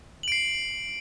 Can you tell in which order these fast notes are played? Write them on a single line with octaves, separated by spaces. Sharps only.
F#7 D7 C7